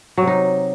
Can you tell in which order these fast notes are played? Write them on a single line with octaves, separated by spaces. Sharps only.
F#3 C3 D#4